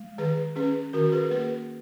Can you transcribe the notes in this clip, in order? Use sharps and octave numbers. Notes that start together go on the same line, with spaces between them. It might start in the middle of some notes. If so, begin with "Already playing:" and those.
Already playing: G#3
D#3 G#4 B4
C#4 G#4 B4
D#3 F#4 A#4
G#4 B4
A#3 G#4 B4